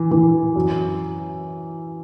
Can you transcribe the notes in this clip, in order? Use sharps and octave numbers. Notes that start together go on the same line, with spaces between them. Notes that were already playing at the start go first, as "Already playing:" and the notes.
Already playing: E3
E3
F#2